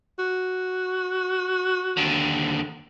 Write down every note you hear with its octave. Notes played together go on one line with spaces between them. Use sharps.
F#4
D#2 D3